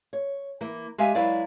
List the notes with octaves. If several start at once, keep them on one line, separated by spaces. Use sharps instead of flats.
C#5
E3 A#3
G#3 G4 E5 F5 G#5
F#3 G#3 E4 B4 D5 F5